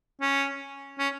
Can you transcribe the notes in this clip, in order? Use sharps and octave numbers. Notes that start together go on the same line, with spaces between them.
C#4
C#4